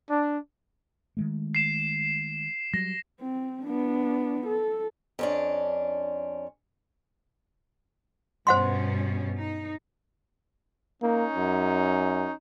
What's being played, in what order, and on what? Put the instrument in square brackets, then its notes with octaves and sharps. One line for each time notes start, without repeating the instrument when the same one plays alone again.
[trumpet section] D4
[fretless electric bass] D#3 G#3 A3
[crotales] C7 E7
[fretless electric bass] F#3 G3 [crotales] A#6
[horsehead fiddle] C4
B3 D4
A4
[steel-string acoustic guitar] F2 C#4 D4
[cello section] G2 B2 C#4 [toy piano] C5 F#5 C6
[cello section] D#4
[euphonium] A#3 [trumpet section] C#4 D#4
[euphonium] F#2